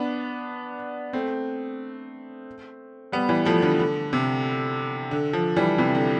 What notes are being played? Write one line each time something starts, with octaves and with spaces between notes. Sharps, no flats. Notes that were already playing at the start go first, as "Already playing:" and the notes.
Already playing: B3 D4
A3 C4
G3 B3
E3 G3
F3 A3
D3 F3
D3
C3
D3
D3 F3
E3 G3
C3 E3
D3